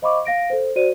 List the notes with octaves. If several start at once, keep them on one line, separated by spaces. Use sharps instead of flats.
C5 D#5 F5 B5 C#6 D6
F5 A#6 D7
A4 C5
F#4 C5 D5 D#7